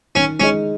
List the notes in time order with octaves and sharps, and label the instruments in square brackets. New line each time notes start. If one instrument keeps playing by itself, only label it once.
[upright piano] D#3 [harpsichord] C#4
[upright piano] G#3 D#4 [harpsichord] C#4